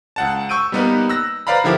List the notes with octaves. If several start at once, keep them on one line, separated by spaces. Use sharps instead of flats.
C#2 F#5 A5
C#6 E6 G6 D7 D#7
G3 A#3 B3 D#4 B4
E6 F#6 A#6
B4 C5 D5 F5 A#5 B5
D3 F3 E4 G4 A#4